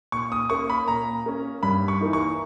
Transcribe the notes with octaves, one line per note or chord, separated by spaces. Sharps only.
A#2 C#6
D#6
A#3 C#4 C#6
B5
A#2 A#5
A#3 C#4
G2 B5
C#6
E3 A#3 D#4
C#6